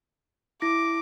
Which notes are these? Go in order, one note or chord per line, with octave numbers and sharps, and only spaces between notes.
E4 D6 A#6